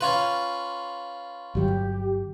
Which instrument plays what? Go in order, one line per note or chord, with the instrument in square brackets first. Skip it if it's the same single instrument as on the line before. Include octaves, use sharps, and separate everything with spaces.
[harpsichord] C#4 F4 B4
[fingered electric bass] G1 F#3 [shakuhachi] G4